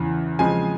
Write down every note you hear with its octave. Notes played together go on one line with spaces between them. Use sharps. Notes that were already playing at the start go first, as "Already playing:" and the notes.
Already playing: E2 C#3 E3
C#3 F3 G#3 C4 G#5